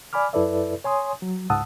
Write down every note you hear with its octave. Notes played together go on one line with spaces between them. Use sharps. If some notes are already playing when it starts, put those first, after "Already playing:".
D5 G#5 B5 D6 F6
F#2 E4 A4 B4 D5 E5
C#5 G#5 C6 D#6
F#3
C#2 G#2 F#5 A5 D#6 E6